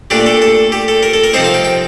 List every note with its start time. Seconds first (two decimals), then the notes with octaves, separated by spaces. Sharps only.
0.10 A#2 A3 D4 G4
0.26 A4
0.42 A4
0.72 G4
0.88 A4
1.03 A#4
1.13 A4
1.24 A#4
1.33 C3 F3 C4 D#4 C5
1.44 F5
1.54 G5
1.65 G5